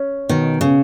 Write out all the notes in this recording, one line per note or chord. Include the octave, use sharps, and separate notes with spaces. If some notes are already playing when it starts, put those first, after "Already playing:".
Already playing: C#4
B2 D#3
C#3